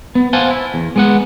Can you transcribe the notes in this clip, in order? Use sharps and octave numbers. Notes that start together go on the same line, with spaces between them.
B3
C5 F5 F#5 G#5 A5
E4
E2
G#3 B3 F#5